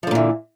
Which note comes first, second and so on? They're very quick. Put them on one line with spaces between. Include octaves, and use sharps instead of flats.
F3 D3 A#2 E3